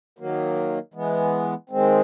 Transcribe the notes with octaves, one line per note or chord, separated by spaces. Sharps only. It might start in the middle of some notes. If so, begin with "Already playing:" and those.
D#3 F#3 A#3
E3 G#3 B3
D#3 G#3 C4